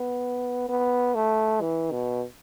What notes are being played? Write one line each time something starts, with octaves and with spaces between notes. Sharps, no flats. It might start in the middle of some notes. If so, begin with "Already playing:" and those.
Already playing: B3
B3
A3
E3
B2